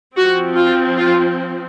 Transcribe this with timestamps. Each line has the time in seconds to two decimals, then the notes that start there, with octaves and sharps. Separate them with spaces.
0.16 F3 C4 F#4
0.56 F4
0.97 F4